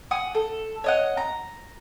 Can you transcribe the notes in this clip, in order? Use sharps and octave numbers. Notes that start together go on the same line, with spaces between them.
F#5 G#5 D#6
A4
C#5 D#5 F#5
A#5